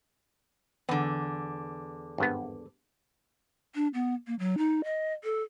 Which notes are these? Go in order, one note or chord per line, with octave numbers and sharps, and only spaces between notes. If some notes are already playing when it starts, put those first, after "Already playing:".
E2 D3 B3
G#1 G2 B3
D4
B3
A#3
F#3
D#4
D#5
A4